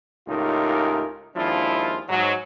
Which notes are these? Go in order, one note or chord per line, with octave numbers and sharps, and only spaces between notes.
C#2 A2 D#4 F4 G4 A#4
D#2 F3 G#3 D4 E4 F4
G#2 F#3